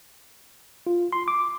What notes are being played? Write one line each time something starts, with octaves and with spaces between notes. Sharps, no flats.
F4
C6
D6